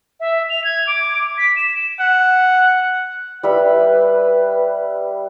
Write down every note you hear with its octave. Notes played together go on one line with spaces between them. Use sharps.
E5
F7
G#6
D6
B6
E7
F#5
G3 B4 E5 B5